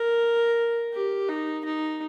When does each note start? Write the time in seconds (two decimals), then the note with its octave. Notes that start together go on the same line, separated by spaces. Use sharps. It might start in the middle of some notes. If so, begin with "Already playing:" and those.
Already playing: A#4
0.94 G4
1.29 D#4
1.65 D#4